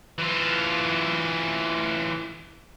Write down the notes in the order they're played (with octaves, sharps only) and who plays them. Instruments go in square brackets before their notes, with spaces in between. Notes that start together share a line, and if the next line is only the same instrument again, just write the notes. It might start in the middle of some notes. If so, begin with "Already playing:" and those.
[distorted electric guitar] E3 F4